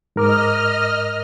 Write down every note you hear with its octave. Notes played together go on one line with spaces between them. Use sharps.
G#2 A#4 D#5 D6 F6